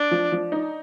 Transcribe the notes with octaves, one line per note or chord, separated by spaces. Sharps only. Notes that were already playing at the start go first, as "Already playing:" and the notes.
Already playing: D4
F3
F3
D#4